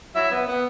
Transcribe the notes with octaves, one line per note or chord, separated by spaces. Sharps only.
F#3 E4 E5
B3
B3